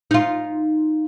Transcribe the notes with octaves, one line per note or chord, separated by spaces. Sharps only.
D#4 F4